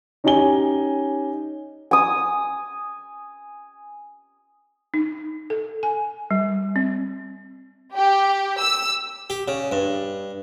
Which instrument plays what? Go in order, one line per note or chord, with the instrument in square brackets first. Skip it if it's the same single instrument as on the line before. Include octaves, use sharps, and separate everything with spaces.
[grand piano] C#4 D#4 G4 C#5 G#5 G7
[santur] G#5 D#6
[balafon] D#4
A4
G#5
G3
C4
[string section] G4
E6
[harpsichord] G4
C#3
G2